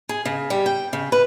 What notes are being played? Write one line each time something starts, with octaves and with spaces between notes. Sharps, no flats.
G#4
C#3
G3
G5
C#3
B4